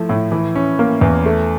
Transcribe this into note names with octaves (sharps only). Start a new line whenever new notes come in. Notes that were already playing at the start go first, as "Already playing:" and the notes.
Already playing: F3 A3 E4
A2
E3
C#4
A#3
E2
A3